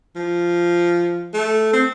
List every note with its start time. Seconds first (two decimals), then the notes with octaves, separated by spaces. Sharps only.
0.16 F3
1.34 A3
1.73 C4